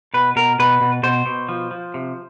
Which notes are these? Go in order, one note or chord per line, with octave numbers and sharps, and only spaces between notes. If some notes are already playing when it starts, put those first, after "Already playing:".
B2 B4
B2 A#4
B2 B4
B2
B2 C5
B2
F3
F3
C3